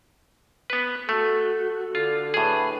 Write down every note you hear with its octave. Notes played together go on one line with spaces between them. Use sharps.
B3 B4
A3 F#4 A4
D3 F4
A2 D4 G#4 B4